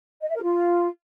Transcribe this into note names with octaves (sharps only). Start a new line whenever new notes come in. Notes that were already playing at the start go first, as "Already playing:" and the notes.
D#5
E5
A#4
F4